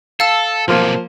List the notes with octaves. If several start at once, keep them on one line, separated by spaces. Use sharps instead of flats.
A4 F5 A5 E6
B1 C3 F3 A#3